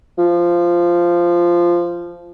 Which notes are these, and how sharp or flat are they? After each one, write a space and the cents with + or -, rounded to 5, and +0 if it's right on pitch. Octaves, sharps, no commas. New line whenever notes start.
F3 -10